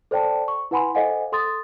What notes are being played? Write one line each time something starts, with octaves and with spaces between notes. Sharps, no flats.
A4 C5 D5 G5 A5
C#6
E4 B4 F#5 G#5 B5 C6
A4 C5 D#5 F5 F#5 G#5
A4 C6 D#6 A6